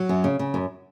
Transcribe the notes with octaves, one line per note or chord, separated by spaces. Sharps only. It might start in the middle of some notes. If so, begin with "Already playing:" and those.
Already playing: F#3
F#2
C#3
C#3
F#2